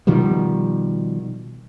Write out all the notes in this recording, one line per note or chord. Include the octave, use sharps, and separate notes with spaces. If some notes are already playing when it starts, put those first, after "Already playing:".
B2 D#3 F3 G3